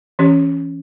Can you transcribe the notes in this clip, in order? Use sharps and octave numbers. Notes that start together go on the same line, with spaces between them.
E3 C#4 G4 C#5